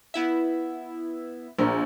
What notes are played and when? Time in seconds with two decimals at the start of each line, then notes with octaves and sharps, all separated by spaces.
0.14 B3 E4 E5
1.58 A#1 A#4